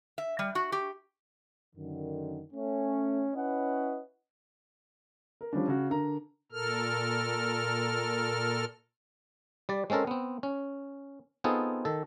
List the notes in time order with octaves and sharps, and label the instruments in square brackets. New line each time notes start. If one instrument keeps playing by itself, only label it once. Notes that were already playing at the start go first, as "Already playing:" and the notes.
[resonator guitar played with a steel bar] E5
G3
F#4
G4
[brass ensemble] F#2 D3 D#3
A3 C#4
C#4 E4 B4 C#5 D#5 F#5
[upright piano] A#4
F3 G3 C#4 D4
C#3 F#4
D3 A#4 A#5
[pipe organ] A#2 A4 A#4 F6
[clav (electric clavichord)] G3 D5
G#3 C4 C#4 A4 A#4
B3 C4
C#4
B3 C4 D#4 F4 G#4 A4
D#3 A4